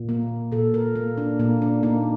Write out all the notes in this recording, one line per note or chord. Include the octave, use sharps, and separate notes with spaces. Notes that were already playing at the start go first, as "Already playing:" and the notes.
Already playing: A#2
A#3
A#2 A4
A#4
A#3
D4
A#2 A#3
D4
A#3 D#4